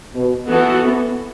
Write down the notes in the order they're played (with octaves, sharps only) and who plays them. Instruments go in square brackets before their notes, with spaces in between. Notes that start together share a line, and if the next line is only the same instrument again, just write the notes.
[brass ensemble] B2
[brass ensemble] B2 [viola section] E3 B3 F#4 A4
[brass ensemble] B3